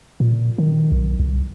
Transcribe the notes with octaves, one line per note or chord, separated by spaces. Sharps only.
A#2
D#3
B1
C2